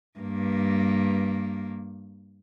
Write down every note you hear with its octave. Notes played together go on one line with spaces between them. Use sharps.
G2 A#3